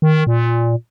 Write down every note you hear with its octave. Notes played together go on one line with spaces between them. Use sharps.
D#3
A#2